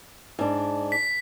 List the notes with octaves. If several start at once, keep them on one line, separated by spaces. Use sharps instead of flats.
G#2 D4
B6